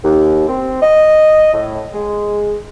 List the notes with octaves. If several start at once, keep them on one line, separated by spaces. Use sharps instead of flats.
D#2
C4
D#5
A2
G#3